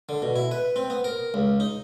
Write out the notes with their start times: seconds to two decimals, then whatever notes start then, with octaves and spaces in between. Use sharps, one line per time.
0.09 D3
0.22 B2
0.36 E4
0.51 B4
0.76 C4
0.90 B3
1.04 A#4
1.34 C#2
1.60 D#4